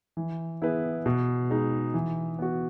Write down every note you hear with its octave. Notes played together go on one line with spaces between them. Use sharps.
E3
B3 E4 G#4 B4
B2
G#3 D#4
E3
B3 F#4